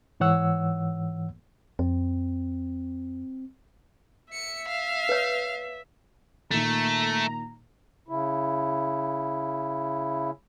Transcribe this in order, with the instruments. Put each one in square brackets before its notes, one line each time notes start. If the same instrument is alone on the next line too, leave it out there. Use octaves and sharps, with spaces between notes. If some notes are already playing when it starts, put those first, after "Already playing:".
[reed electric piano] G#2 E3 C#5 F#5 E6
[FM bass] F2 [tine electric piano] C4
[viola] E5 [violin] C#7
[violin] F5
[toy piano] B4 C#5
[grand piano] A#2 D#3 [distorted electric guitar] A3 [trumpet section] A#5
[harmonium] C#3 E4